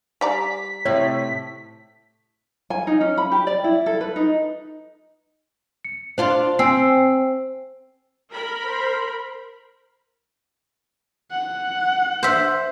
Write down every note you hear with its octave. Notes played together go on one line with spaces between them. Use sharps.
G3 D5 A#5 B6
A2 C3 C#5
G#5
D#4
C#4
B5
G4
D5
E4
A4
B4
D#4
C#7
D4 F4 C5 F5
C4 G#5 E6 C7
A#4 B5
C5
F#5
C5 E5